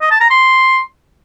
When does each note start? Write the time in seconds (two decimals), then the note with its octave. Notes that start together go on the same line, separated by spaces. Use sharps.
0.01 D#5
0.11 A5
0.20 A#5
0.30 C6